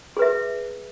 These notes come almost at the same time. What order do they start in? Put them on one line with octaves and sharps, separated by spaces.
G#4 B4 E5